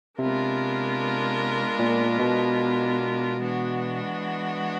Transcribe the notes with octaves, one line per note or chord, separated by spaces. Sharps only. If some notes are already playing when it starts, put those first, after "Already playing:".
C3 G#3 B3 D4 F4 A#4
A#2
B2
E3 G#3 B3 D4 F#4